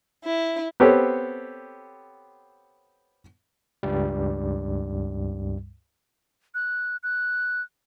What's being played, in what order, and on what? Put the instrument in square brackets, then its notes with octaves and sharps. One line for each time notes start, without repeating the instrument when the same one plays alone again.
[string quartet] E4
[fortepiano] B3 C4 G4 A4 C#5
[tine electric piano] C#2 G2 G3
[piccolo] F#6
F#6